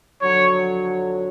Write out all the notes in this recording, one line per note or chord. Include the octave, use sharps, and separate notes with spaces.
F2 D3 F#3 C#5